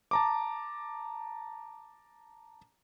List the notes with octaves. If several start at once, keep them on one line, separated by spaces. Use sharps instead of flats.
A5 A#5 D6